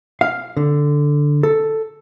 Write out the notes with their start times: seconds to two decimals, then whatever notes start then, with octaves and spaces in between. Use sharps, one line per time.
0.21 F5
0.57 D3
1.43 A4